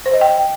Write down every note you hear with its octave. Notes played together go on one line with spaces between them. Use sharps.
C5
D#5
G5